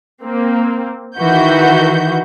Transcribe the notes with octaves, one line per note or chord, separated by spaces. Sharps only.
A#3 C4
D#3 E3 F#4 G6